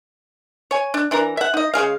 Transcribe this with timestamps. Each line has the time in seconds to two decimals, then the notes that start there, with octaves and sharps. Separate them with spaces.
0.71 C#5 G#5
0.94 D4
1.11 E3 D4 A#4 A#5
1.37 E5 F#5
1.54 D#4 D#5
1.74 C#3 G#3 G#4 F5